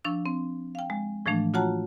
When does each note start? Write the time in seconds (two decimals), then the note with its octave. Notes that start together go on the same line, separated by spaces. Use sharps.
0.04 F3 D4 C#6 E6
0.26 C4
0.75 F5 G5
0.90 G#3
1.26 A2 E3 F3 A3 D4
1.54 F4 F#4 C#5 F#5 A5 A#5